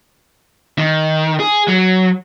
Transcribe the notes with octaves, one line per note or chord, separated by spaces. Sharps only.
D#3
G#4
F#3